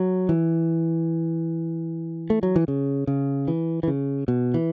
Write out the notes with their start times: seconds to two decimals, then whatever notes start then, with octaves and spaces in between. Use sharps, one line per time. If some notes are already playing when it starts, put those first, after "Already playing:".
Already playing: F#3
0.29 E3
2.30 A3
2.43 F#3
2.56 E3
2.68 C#3
3.07 C#3
3.48 E3
3.83 E3
3.88 C#3
4.28 B2
4.54 E3